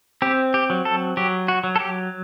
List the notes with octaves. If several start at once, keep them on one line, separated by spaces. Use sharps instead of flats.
C4 G4
G4
F#3
A4
F#3 G4
F#4
F#3
A4
G4